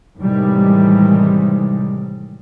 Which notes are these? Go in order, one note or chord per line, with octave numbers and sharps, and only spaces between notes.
A2 C3 D#3 E3 G3 G#3